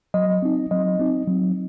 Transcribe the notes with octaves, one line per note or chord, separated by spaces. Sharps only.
F#3 D#5
C4 D#4
F#3 D#5
C4 D#4
F#3